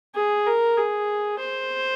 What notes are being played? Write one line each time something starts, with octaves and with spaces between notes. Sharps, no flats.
G#4
A#4
G#4
C5